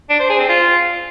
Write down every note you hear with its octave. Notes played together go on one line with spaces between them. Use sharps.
D4
C5
G#4
C4
F4